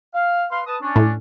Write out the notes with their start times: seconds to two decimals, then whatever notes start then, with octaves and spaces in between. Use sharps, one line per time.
0.14 F5
0.51 B4 F5 C6
0.67 B4 A5 D#6
0.81 C#4 D4
0.96 A2